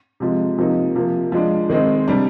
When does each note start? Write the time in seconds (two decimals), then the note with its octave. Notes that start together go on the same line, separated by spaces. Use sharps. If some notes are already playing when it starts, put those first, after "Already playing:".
0.20 C3 F3 G#3
0.58 C3 F3 A#3 D#4
0.95 C3 F3 A#3
1.32 F3 G#3 D4
1.69 D#3 G#3 C4 D#4
2.08 C3 G3 D4